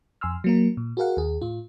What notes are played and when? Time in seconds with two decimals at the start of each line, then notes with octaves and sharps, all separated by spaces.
0.21 F2 G#5 C6 E6 F6
0.44 F#3 A#3 A#4
0.77 A#2
0.97 F#4 G#4 A#4 F5 F#5
1.17 D#2 G#4
1.42 A2 F4